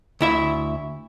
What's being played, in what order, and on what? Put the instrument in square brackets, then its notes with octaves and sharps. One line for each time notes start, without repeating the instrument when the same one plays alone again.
[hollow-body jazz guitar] D2 E4 E5